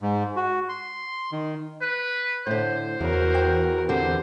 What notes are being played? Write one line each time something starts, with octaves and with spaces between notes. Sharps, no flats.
G#2
F#4
C6
D#3
B4
A2 D3 C5
E2 C#3 F#4 A#4
G5
D3 C4 G4 C5